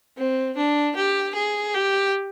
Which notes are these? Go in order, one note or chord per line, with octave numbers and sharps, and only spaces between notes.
C4
D4
G4
G#4
G4